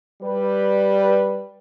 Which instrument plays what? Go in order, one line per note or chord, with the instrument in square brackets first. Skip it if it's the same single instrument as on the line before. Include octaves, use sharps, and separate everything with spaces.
[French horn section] G3 B4